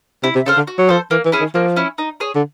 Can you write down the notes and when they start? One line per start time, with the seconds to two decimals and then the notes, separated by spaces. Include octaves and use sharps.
0.23 C3 E4
0.35 C3
0.46 C#3 A4 C5 F5
0.57 D3
0.67 F#4
0.78 F#3
0.89 F3 A4 C5
1.11 E3 A#3
1.25 E3
1.32 C#4 E4 G#4
1.40 D#3
1.54 F3 A#3
1.76 C#4 E4
1.98 D#4
2.20 G#4 C#5
2.35 D3